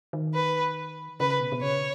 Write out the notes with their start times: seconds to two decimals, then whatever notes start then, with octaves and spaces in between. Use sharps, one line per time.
0.13 D#3
0.34 B4
1.20 C#3 B4
1.40 B2
1.52 B2
1.62 C#3 C#5